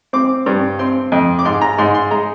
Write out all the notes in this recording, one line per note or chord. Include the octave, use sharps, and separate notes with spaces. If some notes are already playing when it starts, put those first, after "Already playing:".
C4 D6
G2
C4 C6
F2
D6
G#2 C6
A#5
G#2 C6
C6
G#3 A#5